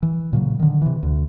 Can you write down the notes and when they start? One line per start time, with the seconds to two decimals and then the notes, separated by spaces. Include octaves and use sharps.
0.03 E3
0.33 A#2 C#3 F#3
0.59 D3 D#3
0.82 C3 E3
1.03 D2